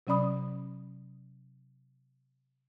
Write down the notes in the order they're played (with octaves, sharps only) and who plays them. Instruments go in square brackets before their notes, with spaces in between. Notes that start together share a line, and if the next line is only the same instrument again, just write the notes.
[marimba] C3 F#3 C#4 D5 B5 D#6